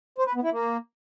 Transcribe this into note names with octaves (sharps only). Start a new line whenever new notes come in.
C5
B4
B3
E4
A#3